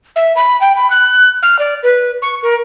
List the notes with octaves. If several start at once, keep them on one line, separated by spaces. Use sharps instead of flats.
E5
B5
G5
B5
F#6
F6
D5
B4
C#6
A#4